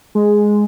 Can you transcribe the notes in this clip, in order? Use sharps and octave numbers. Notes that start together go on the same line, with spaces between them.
G#3